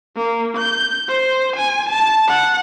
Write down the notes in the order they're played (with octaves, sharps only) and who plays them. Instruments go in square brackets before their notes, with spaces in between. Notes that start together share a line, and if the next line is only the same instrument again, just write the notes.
[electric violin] A#3
G6
C5
G#5
A5
F#5